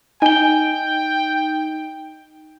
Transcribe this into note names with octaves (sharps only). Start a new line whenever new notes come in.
D#4 G5 G#5 G7